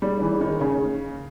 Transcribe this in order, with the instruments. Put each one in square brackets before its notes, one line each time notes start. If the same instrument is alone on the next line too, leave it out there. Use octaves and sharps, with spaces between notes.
[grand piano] G3 [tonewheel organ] A#3 D#4 G#4 C#5
[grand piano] E3
D#3
C#3